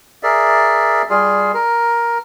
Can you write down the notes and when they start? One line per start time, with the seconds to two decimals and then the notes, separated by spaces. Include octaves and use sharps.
0.23 G#4 A#4 D5 E5
1.10 G3 F4 G#4
1.54 A#4